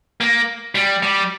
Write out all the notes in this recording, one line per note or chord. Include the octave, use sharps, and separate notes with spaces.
A#3
G3
G3